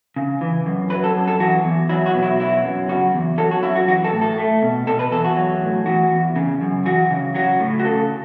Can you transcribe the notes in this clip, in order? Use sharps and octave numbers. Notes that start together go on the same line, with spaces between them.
C#3
E3
F#2
F#3 B4
A4
F#2
A4
E3 F#4
E2
F#3 E4
F#4
B2
E4
F#3 E4
F#2
C#3 F#4
E2
F#3 A4
F#4
F#2 E4
F#4
E3 F#4
A4
A2
A4
A3
B2
B2 A4
B4
E2 A4
F#4
F#3
A2
E3 F#4
E2
C#3
F#2
E3 F#4
C#3
F#3 F#4
A2
F#4
C#3 A4